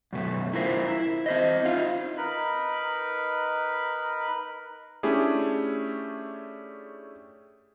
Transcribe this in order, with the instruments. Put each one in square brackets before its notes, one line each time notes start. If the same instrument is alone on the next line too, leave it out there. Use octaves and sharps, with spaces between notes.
[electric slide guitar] F#2 B2 A3
E4 F4 A#4 C5
E4
C4 C5 D#5
D#4 F4 F5
[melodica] D#4 A#4 B4 B5
[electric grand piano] A3 C#4 D4 E4 G4 G#4